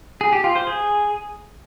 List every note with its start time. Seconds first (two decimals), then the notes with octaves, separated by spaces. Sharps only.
0.21 G#4
0.32 G4
0.44 F4
0.55 C5
0.67 G#4